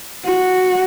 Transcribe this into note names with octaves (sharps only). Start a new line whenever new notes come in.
F#4